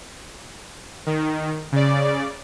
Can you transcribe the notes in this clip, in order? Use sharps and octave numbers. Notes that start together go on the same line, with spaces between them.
D#3
C#3 D5